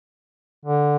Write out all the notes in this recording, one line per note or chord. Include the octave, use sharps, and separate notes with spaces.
D3